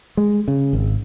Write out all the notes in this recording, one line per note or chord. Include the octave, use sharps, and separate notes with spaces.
G#3
C#3
G#1